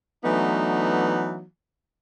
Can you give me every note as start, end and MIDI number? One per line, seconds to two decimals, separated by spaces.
0.24 1.43 52
0.24 1.43 54
0.24 1.43 57
0.24 1.43 59
0.24 1.43 62
0.24 1.43 63